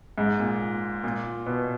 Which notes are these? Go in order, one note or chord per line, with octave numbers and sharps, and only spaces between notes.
G#2
A#2
A#2
B2